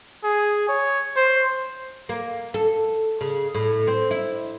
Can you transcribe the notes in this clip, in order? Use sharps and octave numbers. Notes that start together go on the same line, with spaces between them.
G#4
C#5
C5
A#3
A4
C#3
A2
C4
E4